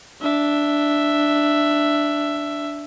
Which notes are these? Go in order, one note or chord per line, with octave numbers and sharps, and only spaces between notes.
D4 E5